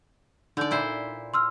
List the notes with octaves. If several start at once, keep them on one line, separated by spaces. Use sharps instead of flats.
D3 D#4 D5 G6
A#2 E4 C5
C6 E6 F6